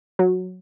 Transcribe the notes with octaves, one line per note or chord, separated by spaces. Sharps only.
F#3